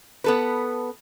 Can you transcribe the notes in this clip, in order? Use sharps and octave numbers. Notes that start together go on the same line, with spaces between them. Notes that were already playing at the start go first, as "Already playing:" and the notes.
B3 A4 B4